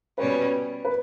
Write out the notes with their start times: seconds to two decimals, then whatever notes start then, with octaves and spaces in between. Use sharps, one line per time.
0.18 B2 G3 C#4 B4
0.85 B4